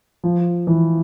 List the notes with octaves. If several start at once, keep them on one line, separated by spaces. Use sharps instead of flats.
F3
E3